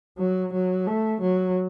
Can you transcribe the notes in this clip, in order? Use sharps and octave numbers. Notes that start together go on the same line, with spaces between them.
F#3
F#3
A3
F#3